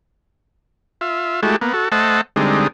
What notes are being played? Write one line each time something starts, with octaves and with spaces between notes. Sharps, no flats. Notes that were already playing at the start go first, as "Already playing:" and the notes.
F4 E5
G#3 A3 E4 F#4 G4 A4
A#3 B3
F#4 A4
A3 C5 D#5 F#5 A5 E6
D3 G3 G#3 C4 D#4